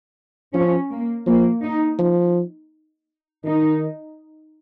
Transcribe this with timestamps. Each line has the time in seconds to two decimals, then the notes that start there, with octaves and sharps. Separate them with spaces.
0.54 F3 C#4
0.91 A#3
1.26 F3 A#3
1.63 D#4
1.99 F3
3.44 D#3 D#4